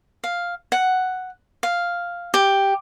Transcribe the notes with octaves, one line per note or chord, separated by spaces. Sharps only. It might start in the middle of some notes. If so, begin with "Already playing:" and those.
F5
F#5
F5
G4